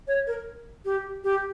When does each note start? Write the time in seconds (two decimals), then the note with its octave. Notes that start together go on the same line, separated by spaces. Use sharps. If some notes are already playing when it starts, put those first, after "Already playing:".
0.07 C#5
0.27 A#4
0.85 G4
1.24 G4